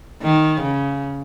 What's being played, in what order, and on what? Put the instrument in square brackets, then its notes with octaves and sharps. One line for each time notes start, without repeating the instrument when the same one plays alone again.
[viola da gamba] D#3
C#3